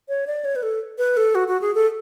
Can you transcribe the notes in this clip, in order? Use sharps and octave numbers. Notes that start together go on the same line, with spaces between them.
C#5
D5
C#5
B4
A4
B4
A4
F#4
F#4
G#4
A4